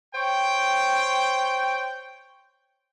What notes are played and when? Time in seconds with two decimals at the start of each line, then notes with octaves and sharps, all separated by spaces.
0.15 C5 C#5 G5